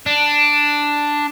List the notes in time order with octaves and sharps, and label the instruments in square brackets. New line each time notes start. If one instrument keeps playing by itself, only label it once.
[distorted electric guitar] D4